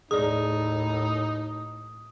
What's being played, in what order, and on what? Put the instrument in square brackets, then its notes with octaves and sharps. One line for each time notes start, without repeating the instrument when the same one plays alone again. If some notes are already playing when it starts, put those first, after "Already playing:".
[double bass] D#2 A2 [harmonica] D#4 [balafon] G#4 D5 [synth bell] D#6